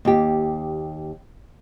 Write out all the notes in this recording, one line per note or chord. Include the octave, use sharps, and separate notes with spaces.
D#2 G4